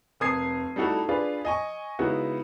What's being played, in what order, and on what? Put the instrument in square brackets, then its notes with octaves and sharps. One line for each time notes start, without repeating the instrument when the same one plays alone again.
[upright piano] F1 A#4 D#6 G#6 C7
G3 A3 D#4 E4 F#4 A4
D4 F4 G#4 B4 D5
D#5 G#5 C#6
C#3 G#3 B3 D#4 E4 F#4